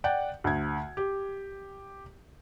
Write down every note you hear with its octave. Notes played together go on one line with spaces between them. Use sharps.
D5 F#5 G5
D2 G#6
G4